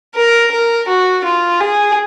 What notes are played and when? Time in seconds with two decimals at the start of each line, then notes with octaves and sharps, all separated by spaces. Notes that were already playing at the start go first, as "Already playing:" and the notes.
0.15 A#4
0.51 A#4
0.88 F#4
1.25 F4
1.60 G#4